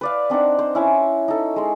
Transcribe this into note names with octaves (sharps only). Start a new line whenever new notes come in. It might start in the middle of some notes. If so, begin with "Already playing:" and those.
B4 D5 F5
C4 D4 D#4 F#5
C5
C#4 E4
D#4 A4
G#3 C6